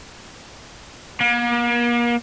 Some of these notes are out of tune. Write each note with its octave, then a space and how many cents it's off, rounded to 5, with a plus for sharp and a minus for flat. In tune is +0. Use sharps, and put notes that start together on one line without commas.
A#3 +40